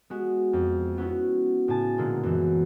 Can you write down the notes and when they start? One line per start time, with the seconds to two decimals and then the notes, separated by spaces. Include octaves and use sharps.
0.10 G#3 B3 F#4
0.53 F2
0.98 B3 C#4 E4 F#4
1.68 A2 C#3 G#5 A5
1.98 A#2 D3 G#3 A#3 B3
2.23 F#2 E3